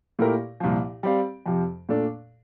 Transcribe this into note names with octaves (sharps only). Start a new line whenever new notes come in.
A#2 A3 E4 G4 A#4
C2 A#2 F3
G3 C4 G4 D5 F5
F2 C3 F3
A#2 A3 D4 A4